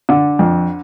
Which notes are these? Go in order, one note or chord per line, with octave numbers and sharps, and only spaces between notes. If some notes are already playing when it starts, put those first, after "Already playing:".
D3
F2